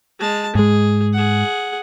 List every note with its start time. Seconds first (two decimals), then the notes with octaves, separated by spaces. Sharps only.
0.19 G#3 A5
0.55 G#2 G#3 G#4
1.13 G#4 F#5